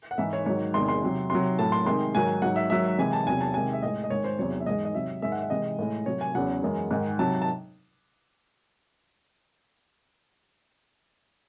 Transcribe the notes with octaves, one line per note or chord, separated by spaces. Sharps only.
F#5
G#2 E3 G#3 E5
C#5
G#2 D#3 F#3 C#5
E2 C3 D#3 G#3 C6
C6
C3 F#3
C3 F#3 C6
A2 F#3 A5
C6
C3 D#3 G#3 C6
G#2 D#3 F#3 G#5
G#2 F#3 F#5
E5
G#2 D#3 F#3 E5
C3 E3 G#3 G#5
A5
E2 C3 F#3 G#5
A5
C3 D#3 G#3 G#5
E5
A2 G#3 D#5
D#5
G#2 D#3 G#3 C#5
C5
E2 C3 F#3 C#5
E5
G#2 E3 G#3 D#5
D#5
C3 F#3 E5
G#2 D#3 G#3 E5
F#5
E5
C3 E3 G#3 D#5
A2 G#3
C3 F#3 C#5
G#5
E2 C#3 F#3 F#5
F#2 E3 G#3
G#2 D#3 G#3
C3 F#3 A5
A5